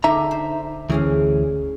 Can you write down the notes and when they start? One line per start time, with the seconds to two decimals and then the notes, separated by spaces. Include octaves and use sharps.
0.04 D3 D4 D#4 E5 G5 A#5
0.31 C5
0.90 D2 E3 C#4 G#4 F5